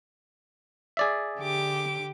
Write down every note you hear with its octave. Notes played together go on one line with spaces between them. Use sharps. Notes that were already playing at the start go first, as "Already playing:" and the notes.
G#4 D5 E5
D3 G4 D6